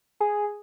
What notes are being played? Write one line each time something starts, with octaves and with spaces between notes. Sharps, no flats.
G#4